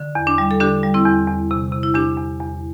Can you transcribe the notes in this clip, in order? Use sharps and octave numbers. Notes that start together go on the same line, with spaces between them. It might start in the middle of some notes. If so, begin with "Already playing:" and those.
Already playing: D3
E2
D4
G3
A4
D3 D4 G4
G3
C4 E4
E2
E2
C3
C3
E4
E2 D4 G4
E2
E2